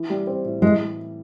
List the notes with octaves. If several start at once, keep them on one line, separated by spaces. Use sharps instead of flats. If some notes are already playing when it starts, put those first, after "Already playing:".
Already playing: E3
G3
C4
A2
E3 G#3